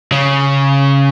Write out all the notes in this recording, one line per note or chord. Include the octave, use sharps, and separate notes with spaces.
C#3